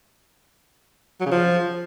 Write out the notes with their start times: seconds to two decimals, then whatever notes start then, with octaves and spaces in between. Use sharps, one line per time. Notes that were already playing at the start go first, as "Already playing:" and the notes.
1.20 F#3
1.26 C#3
1.32 F3